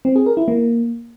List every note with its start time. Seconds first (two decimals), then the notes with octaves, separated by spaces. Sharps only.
0.05 C4
0.16 G#4
0.26 A#4
0.37 E4
0.48 A#3